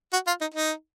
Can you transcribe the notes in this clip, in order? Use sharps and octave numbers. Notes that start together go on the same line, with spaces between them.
F#4
F4
D#4
D#4